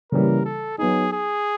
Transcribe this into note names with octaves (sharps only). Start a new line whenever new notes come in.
C#3 E3 G3 A#3 A#4
A4
F#3 B3 D#4 G#4
G#4